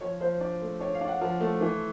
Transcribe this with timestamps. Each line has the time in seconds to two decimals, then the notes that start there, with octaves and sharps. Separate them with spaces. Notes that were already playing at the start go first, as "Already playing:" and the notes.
0.01 F3 C#5
0.21 F3 C5
0.41 D4
0.61 A3
0.80 D4 C#5
0.94 F5
1.01 D4
1.08 F#5
1.21 F3
1.40 A3
1.61 E3